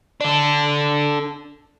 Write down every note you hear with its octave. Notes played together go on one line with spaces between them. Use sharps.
D4 A4